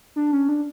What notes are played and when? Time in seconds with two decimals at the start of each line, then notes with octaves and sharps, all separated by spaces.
0.16 D4
0.33 C#4
0.49 D4